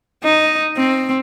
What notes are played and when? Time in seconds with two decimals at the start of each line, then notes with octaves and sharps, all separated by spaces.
0.24 D#4
0.77 C4